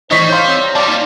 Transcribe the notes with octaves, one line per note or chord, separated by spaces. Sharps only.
A2 E3 G3 D#4 C5 D#5 C#6 B6
C#5 F5 C6 G6
C4
A#5
F3 G3 D5 A5
A#3 D#4